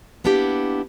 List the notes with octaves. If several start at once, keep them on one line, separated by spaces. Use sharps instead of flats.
A#3 B3 D4 E4 G4